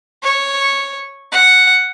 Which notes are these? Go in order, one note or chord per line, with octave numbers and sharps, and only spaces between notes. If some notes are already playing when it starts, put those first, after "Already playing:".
C#5
F#5